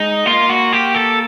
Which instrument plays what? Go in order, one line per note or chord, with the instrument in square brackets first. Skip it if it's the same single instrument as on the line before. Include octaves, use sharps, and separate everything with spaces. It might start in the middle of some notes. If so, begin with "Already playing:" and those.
Already playing: [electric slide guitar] G#3 [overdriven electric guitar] D#4
[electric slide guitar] A#3 [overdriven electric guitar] F4
[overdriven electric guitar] F#4
G4
A4